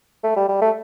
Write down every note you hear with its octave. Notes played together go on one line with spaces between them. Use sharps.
A3
G3
G3
A3